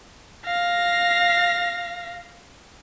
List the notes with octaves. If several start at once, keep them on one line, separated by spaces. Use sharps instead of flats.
F5 A#6